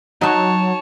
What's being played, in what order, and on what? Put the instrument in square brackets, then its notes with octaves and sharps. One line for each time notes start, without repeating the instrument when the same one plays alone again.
[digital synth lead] F#3 [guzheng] D#4 F#4 [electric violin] C#5 A5